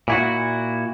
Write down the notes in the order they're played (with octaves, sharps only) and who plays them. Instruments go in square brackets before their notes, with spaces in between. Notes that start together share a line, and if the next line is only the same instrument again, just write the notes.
[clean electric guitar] A#2 E4 F#4